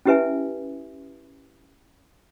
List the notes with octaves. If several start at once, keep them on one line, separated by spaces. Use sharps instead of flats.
C#4 E4 G4 B4 E5 G#5